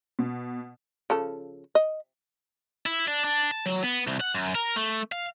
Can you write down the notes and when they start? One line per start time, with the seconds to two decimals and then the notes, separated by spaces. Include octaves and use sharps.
0.19 B2
1.10 C#3 F3 A4
1.75 D#5
2.86 E4
3.08 D4
3.24 D4
3.51 A5
3.66 F#3
3.83 B3
4.07 C2
4.20 F#5
4.35 F#2
4.55 A#4
4.76 A3
5.12 F5